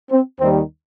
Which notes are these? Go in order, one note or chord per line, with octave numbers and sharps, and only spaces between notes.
C4
D#2 D#3 G3 C4